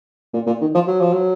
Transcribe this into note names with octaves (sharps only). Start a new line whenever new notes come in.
A#2
A#2
D#3
F3
F#3
F3
F#3